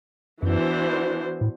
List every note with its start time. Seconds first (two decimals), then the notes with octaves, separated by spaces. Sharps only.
0.43 F#2 E3 B3 D4 F#4 C5
1.41 A2